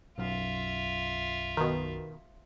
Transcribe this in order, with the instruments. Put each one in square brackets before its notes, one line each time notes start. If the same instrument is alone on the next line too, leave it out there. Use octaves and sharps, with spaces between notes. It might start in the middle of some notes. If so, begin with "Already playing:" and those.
[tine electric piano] B1 F#2 F5 [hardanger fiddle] F4 E5
[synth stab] B2 D#3